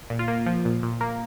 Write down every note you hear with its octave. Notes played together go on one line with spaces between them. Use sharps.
A#2
F4
A#3
F3
A#2
A#2
A#3